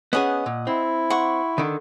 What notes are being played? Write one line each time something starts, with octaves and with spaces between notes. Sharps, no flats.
B3 C#4 G#4 D#5 F#5
A#2
C4 E4
F#5 C6 C#6
D3 D#3